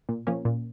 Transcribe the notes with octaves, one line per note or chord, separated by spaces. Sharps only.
A#2
F3 A#3 C#4
A#2